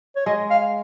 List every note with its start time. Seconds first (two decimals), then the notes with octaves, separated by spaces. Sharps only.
0.16 C#5
0.26 G#3 D#5
0.50 F5